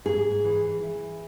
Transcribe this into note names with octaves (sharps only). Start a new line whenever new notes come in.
G#2 G#4
E3
E3